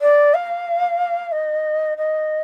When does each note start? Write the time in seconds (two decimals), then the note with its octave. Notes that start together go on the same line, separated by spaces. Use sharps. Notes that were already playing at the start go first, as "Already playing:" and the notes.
0.01 D5
0.34 F5
1.32 D#5
1.97 D#5